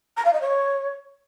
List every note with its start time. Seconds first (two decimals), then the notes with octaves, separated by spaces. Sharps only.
0.17 A#5
0.25 F5
0.33 D#5
0.41 C#5